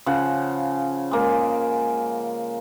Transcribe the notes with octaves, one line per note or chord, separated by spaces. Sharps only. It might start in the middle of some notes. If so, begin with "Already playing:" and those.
C#3 F3 F#5
G#3 A#3